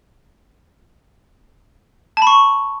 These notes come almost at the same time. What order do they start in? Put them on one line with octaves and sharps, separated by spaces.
A5 B5 C#6